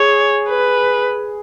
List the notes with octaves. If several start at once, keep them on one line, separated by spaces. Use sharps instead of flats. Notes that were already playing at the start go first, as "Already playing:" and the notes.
Already playing: G#4 C#5
B4